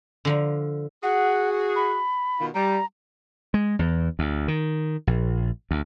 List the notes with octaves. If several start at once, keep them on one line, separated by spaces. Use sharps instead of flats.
D3 F3 A#5
F#4 G#4 F#5
B5
B2 D#3 F4
G3 A#5
G#3
E2
D2
D#3
A#1
D2